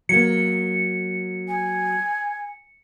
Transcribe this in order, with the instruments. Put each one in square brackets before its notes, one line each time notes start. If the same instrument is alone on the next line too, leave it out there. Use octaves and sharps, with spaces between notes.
[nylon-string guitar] F#3 A#3 [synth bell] C#7
[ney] G#5